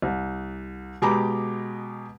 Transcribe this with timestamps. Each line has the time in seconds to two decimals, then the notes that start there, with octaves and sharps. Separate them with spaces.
0.02 C2
1.02 B2 G#3 G4 A#5 B5 D6